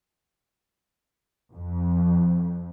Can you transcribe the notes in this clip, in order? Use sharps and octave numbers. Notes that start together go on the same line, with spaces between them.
F2